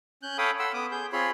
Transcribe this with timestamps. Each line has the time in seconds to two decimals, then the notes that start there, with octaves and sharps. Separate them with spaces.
0.23 C#4 F#6 G6
0.38 A4 C#5 F5 G5 B5 D#6
0.59 A4 F#5 B5 C6 E6
0.74 B3 D6 D#6
0.91 G#4 G6
1.13 C4 F4 G#4 C#5 B5 C6